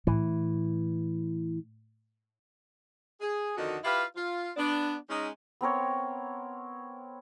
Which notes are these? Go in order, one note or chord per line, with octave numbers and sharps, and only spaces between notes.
A2 E3
G#4
F2 D3 D#3 D#4 F#4
E4 F4 G4 B4 E5 F5
F4
B3 D4
G#3 C#4 D#4
B3 C4 A#4 C#5